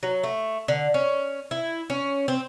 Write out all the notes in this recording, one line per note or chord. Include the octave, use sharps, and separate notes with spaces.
F#3
A3
D3
C#4
E4
C#4
C4